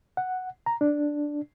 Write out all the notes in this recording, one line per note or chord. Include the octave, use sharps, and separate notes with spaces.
F#5
A#5
D4